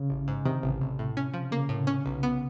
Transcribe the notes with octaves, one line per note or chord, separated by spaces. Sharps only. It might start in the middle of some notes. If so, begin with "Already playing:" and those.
Already playing: C#3
A1
G#2
C3 D#3
A1
A1
A2
C#4
F3
C#3 A#3
A2
C#4
B1
B3